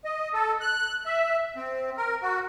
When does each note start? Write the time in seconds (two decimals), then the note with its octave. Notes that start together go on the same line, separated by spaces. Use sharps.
0.04 D#5
0.34 A4
0.61 F#6
1.06 E5
1.56 C4
1.97 A#4
2.22 F#4